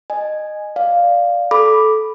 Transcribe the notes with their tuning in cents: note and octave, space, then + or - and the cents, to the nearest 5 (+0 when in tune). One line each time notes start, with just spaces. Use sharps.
D#5 -15 G#5 +0
D5 +0 F5 +0
A4 -15 B5 +0 D6 +0